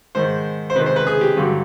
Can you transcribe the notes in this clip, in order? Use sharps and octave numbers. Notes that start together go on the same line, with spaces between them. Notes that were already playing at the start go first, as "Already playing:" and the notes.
G#2 D#3 G#3 C5
C5
C3 D#3 G#3 B4
C5
B4
G#4
G4
G2 D3 F#3